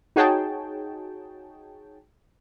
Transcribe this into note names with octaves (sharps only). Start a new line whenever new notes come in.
D#4 F#4 G#4 C#5 G5 A5